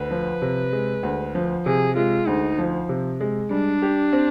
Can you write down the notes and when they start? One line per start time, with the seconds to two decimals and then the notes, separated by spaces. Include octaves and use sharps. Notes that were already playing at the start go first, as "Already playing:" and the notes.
Already playing: D2 B4
0.11 F3
0.42 C3
0.73 G#3
1.03 D2
1.35 F3
1.66 C3 G#4
1.96 G#3 F4
2.27 D2 D#4
2.58 F3
2.89 C3
3.20 G#3
3.51 G3 D4
3.82 G4
4.13 C4